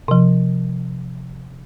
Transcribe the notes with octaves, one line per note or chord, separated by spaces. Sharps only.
C3 F3